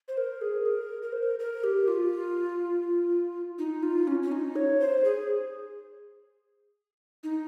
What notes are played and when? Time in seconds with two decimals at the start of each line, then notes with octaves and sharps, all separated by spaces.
0.08 C5
0.17 A#4
0.41 G#4
0.66 A#4
1.02 A#4
1.12 C5
1.23 A#4
1.39 A#4
1.64 G4
1.88 F4
3.58 D#4
3.83 F4
4.07 C#4
4.23 C#4
4.32 D#4
4.56 C#5
4.80 C5
5.05 G#4
7.23 D#4